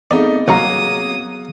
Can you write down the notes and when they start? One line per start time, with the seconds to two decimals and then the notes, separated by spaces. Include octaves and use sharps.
0.11 A3 B3 C4 D#4 G#4 D5 D#5
0.48 C2 F#3 A#3 F#4 F5 A#5 D#6